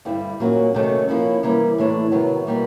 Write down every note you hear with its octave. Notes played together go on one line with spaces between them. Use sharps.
G2 D3 G3 C4 E4
A#2 F#3 A#3 C#4 F#4
C3 D#3 F#3 A3 C#4
F3 A#3 C#4 E4
C3 E3 G3 A#3
A2 E3 A3 D4
C3 D#3 F#3 B3
B2 G3 A#3